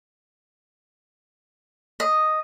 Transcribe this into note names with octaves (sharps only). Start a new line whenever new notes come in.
D#5